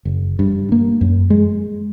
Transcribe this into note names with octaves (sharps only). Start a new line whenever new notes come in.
F#1
G2
A#3
F#2
G#3